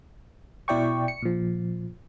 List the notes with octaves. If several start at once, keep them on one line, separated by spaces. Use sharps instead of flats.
B2 E4 D5 G5 C#6
C#7
A#2 F3